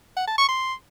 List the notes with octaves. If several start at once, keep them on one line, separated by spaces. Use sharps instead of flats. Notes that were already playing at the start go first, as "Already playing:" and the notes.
F#5
A5
C#6
C6